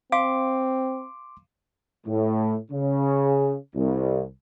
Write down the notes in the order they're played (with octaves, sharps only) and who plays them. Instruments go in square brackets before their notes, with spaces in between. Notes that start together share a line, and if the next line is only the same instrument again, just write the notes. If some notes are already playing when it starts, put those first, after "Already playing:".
[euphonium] C4 [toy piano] F5 [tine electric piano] C6 D6
[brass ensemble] A2
C#3
C2